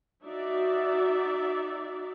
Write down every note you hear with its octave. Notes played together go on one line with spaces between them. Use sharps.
D#4 F#4 D5 E5